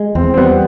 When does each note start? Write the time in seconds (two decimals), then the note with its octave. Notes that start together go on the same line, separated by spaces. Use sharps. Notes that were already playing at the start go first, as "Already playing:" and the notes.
Already playing: G#3
0.15 E2 C4
0.34 C4
0.38 G3 B3